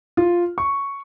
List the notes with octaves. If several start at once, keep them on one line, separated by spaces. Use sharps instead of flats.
F4
C#6